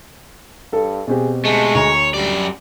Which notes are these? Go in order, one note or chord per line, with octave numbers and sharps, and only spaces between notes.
G2 A4
B2 C4 G4 G#4
D3 G#3 A3
D2 C#5 A#5
F#2 G3 D5